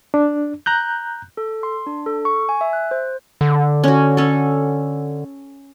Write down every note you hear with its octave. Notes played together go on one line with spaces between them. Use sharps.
D4
A#5 F#6 G6
A4
C6
D4
A4
C#6
G#5
E5
F#6
C5
D3
C#4 F#4
C#4 A4